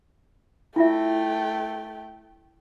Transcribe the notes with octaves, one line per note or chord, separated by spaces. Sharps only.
A3 E4 F4 E5 G5